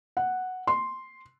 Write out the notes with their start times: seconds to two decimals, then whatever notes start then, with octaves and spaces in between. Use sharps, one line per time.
0.17 F#5
0.67 C6